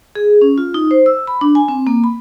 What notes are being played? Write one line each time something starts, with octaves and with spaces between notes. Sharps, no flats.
G#4
C#4
F4
D#4
C5
E6
B5
D4
G#5
C4
A#3
B5